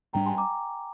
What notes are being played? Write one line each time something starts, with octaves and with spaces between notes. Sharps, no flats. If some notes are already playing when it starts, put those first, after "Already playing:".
G#2 G3 D4 G5 A#5
G#5 C6
A#5 D6